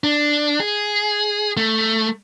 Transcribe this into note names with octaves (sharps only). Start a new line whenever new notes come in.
D4
G#4
A3